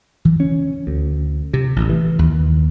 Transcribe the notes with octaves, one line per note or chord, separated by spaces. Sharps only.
E3
C#4
D2
C3
A1
E3
D#2